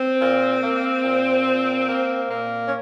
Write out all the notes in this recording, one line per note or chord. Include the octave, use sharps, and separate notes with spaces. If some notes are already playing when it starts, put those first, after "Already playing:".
Already playing: C4
A#2
A#3
A#2
A#2
A#3
A#2 A#3
C#4